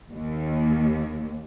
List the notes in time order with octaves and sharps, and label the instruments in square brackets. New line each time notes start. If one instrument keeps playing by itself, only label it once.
[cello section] D#2